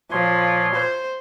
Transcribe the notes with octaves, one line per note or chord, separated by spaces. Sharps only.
A#2 F3 C#5 C6
C5